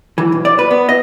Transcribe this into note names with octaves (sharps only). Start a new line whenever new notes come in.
E3
B1
D5
B4
B3
D#5